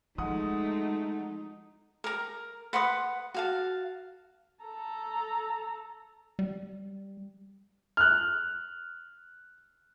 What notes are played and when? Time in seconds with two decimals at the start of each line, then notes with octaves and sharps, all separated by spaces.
0.18 F3 G#3 A3 D#4 F#5 D#6
2.04 A#4 A#5
2.73 B4 F#5 C6 D#6
3.34 F#4 F5 A5
4.64 A4 A#5
6.39 G3
7.97 F6 F#6